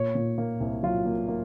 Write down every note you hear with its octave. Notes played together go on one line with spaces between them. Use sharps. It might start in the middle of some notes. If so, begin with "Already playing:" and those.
Already playing: A#2 C#5
A#2
A#3
C2
F#3 F4
A#3
A#3